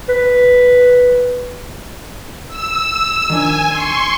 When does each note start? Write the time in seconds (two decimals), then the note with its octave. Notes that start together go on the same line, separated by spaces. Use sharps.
0.09 B4
2.48 E6
3.30 D#3 F3 D4 G#5
3.69 C6 C#6